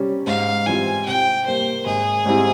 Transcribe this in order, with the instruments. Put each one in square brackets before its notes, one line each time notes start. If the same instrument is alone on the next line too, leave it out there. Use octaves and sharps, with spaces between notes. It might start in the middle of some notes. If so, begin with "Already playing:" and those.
Already playing: [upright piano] C3 G3 C#4
[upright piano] G#2 [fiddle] F5
[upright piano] E3 G3 C4 F4 [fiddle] G#5
[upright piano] C3 [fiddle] G5
[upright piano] G3 A#3 [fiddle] C5
[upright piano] G#1 [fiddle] G#4
[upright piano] G#2 G3 C4 E4